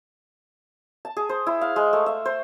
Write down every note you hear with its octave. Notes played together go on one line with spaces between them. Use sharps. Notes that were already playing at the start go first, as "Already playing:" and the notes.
A5
G#4
C5
E4
F5
G#3
A3
E5
C5